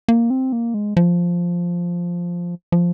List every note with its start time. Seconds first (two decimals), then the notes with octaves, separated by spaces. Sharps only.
0.08 A#3
0.30 C4
0.52 A#3
0.74 G#3
0.97 F3
2.72 F3